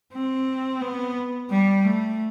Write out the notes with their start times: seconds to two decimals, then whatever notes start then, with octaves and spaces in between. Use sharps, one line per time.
0.13 C4
0.81 B3
1.50 G3
1.84 A3